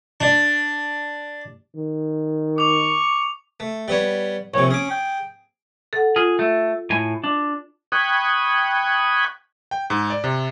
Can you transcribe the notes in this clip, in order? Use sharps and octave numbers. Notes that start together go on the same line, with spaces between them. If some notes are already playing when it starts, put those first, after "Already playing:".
D4
D#3
C#6 D6 F7
A3
G3 B3 C#5
A#1 C3 C#5
C#4 G#4 D6
G5
A4 F#5
F4 G#4
A3
A2 G#5
D4
G5 B5 C#6 D#6 F#6 G#6
G5
G#2
D5
C3